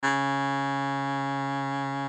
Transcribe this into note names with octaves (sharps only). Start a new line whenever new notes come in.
C#3